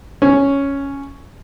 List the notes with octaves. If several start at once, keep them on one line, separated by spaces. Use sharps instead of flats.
C#4